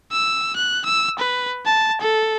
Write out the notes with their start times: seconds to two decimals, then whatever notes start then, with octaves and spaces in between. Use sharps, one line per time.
0.12 E6
0.56 F#6
0.85 E6
1.19 B4
1.65 A5
2.01 A4